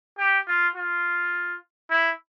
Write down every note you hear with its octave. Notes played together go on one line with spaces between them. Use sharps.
G4
F4
F4
E4